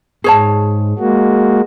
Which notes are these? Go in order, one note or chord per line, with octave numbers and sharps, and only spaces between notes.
G#2 G#4 C#5 A5
G#3 A#3 F#4